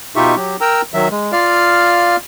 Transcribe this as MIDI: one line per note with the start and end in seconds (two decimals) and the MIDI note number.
0.16 0.35 47
0.16 0.35 63
0.16 0.35 65
0.16 0.35 67
0.16 0.35 76
0.16 0.35 85
0.36 0.56 54
0.36 0.56 67
0.61 0.82 70
0.61 0.82 79
0.61 0.82 82
0.61 0.82 88
0.94 1.08 51
0.94 1.08 54
0.94 1.08 76
1.11 1.32 56
1.32 2.16 65
1.32 2.16 74
1.32 2.16 77
1.32 2.16 89